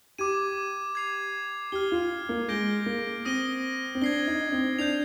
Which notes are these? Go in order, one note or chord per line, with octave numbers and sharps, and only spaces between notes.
G4 D6 G#6 D#7
G#6 C7 F7
G4 F6 C7 G7
F4
A#3
G#3 G6 A#6 D7 G7
A#3
C4 D#6 A#6 D#7 G7
C4
D4 G#6 C7 G7
D#4
C4
D4 G6 C7 F7